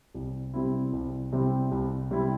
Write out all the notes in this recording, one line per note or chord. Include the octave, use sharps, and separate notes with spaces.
C2
C3 G3 C4 E4
C2
C3 G3 C4 E4
C2
C3 G3 C4 E4